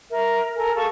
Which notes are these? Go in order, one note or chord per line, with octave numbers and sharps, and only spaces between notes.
A#4 E5
A4 A#4 G#5
G#4 A4 F5 C#6